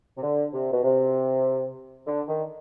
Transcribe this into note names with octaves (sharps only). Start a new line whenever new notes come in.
C3
D3
C3
B2
C3
D3
D#3